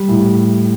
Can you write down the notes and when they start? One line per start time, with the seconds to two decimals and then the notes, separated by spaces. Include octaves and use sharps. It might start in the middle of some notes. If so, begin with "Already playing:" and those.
Already playing: G3
0.08 A2